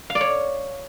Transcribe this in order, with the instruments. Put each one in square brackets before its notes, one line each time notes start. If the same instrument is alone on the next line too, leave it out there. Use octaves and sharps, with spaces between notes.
[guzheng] F5
D5
C#5